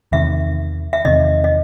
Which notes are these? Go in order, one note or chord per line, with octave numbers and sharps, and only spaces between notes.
E2 C3 D#3 E5
E5
E2 C3 D#3 D#5
D#5